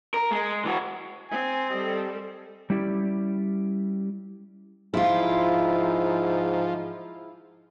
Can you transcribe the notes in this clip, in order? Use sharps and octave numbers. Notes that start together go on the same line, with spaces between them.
A#4
G#3
E3 F#4
C4 G#5
G3 A4 D#5
G3 C#4 E4 G4 D5
G#2 F3 E4 F4